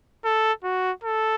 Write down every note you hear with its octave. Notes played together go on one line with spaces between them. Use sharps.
A4
F#4
A4